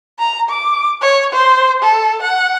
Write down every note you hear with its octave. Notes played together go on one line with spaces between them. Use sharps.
A#5
D6
C#5
C5
A4
F#5